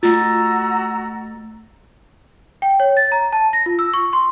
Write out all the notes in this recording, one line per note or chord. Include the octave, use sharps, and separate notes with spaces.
A3 F4 F#4 A#5 E6 A6
G5
C#5
A6
A#5
A5
A#6
F4
E6
C#6
C6